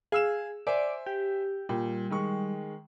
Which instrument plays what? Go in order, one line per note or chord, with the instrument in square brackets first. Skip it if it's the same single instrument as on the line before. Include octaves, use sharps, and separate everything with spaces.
[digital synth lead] G#4 [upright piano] F5 E6 E7
[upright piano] C5 E5 G#5 [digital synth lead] D5
[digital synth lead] G4
[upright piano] A#2 [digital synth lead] G3
[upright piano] D#3 G#3 C#6